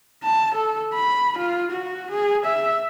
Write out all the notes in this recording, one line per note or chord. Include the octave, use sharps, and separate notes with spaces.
A5
A4
B5
F4
F#4
G#4
E5